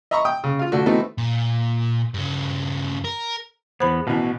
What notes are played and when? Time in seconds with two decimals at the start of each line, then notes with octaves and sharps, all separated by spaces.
0.11 D#5 E5 A#5 B5 C#6
0.25 G5 D#6
0.44 C#3
0.59 F4 F5
0.72 D3 A3 F#4
0.86 E3 A3 B3 C4 D#4 F#4
1.18 A#2
2.14 G2 C#3
3.04 A#4
3.80 E2 B3 C5 B5
4.07 A1 B2 E3